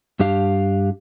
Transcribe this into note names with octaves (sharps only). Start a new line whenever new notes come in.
G2 D4 G4 F5